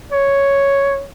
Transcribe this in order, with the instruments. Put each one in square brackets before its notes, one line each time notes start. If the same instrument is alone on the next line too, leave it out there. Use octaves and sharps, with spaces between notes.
[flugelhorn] C#5